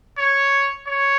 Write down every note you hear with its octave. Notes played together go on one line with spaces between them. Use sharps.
C#5
C#5